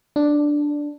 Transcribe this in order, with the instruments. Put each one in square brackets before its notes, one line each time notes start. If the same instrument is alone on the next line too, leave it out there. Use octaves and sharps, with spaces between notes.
[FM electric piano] D4